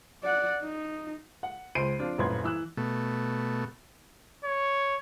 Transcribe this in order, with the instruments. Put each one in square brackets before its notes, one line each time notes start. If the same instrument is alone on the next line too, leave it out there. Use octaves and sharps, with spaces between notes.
[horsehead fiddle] D5 F#5
D#4
[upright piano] F#5
C#2 C5 C7 D7 D#7
F3 C4 D4 F4
D#1 A1 F#2 B4 C6 G#6
E3 E6 F#6
[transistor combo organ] B2 A3
[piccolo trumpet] C#5